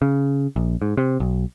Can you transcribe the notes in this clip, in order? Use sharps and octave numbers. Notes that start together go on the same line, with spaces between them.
C#3
A#1
G#2
C3
B1